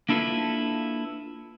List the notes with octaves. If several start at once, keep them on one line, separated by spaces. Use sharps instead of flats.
A#3 D4 E4 F4 A4 B4